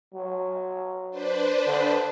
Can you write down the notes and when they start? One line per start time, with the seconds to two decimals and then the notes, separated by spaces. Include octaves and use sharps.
0.14 F#3
1.11 D4 B4 C5
1.67 D3